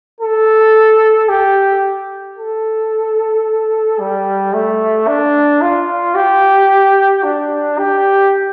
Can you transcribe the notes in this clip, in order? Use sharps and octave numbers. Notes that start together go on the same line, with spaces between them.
A4
G4
A4
G3
A3
D4
F4
G4
D4
G4